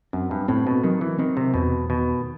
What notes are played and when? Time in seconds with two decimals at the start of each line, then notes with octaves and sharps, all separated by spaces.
0.13 F#2 C4
0.31 G2
0.48 A2 C4
0.67 B2
0.84 D#3 F#3
1.01 E3
1.18 D#3 C4
1.37 C3
1.54 E2 B2
1.90 B2 D#3